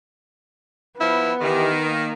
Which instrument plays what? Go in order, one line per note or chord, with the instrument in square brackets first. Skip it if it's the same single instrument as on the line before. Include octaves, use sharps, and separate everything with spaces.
[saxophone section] F3 E4 [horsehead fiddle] B3
[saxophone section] D#3 [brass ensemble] E3 G4
[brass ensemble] A#3